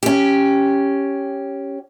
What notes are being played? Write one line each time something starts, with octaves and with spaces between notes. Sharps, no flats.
C#4 G4